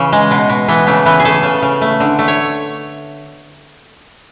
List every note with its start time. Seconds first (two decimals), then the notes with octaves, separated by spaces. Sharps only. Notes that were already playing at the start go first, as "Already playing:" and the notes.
Already playing: C#3 E3
0.13 G#3
0.31 B2
0.49 B2
0.68 E3 B3
0.87 C#3 A3
1.06 E3 B3
1.20 G#4
1.25 A3 A4
1.43 C#3
1.62 C#3
1.82 A3
2.00 D3
2.19 A3
2.28 C#5